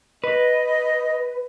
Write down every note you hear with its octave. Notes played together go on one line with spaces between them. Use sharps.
B4 D#5